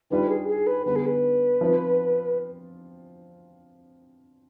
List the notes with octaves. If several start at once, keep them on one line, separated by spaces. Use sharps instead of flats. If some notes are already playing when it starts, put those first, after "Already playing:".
D#3 G3 D4 F4 B4
G#4
G#4
B4
D3 G3 B3 B4
G#4
B4
F3 C4 F4